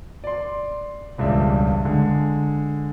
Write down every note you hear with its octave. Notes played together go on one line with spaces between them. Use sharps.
D5 C6
E1 C#2 G2 D5 E5
D3 G#3